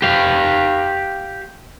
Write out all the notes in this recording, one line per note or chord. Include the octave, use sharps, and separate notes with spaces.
G4 F5